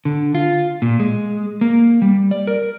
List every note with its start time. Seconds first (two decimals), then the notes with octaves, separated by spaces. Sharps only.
0.05 D3
0.35 F4
0.82 A#2
1.00 G#3
1.61 A#3
2.02 G3
2.31 D5
2.47 A#4